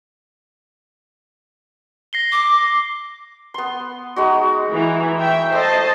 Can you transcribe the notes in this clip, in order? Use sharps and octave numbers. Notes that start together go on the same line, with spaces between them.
A#6 C7 G7
D6
B3 C6
G#3 D#4 F#4
E3
E5 G5
A3 C5 D#5 A5